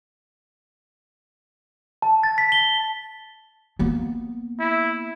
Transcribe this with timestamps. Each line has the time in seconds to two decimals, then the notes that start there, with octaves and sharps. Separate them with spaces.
2.02 A5
2.23 A6
2.38 B6
2.52 G7
3.79 A#3 B3
4.59 E4